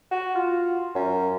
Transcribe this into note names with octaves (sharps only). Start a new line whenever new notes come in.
F#4
F4
F#2